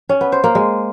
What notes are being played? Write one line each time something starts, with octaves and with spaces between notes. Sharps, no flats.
C#4
B3
C5
A#3
G#3